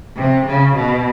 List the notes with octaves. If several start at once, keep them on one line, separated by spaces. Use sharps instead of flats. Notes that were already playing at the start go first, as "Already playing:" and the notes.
C3
C#3
B2